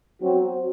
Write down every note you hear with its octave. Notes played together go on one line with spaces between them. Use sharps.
F#3 C4 F#4